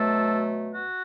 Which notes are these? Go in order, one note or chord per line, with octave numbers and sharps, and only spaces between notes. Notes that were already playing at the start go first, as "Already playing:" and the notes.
Already playing: B2 F#3 A3 A4
F#4